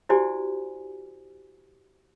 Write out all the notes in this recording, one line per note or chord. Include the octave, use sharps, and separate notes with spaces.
E4 F#4 G4 C5 D5 G#5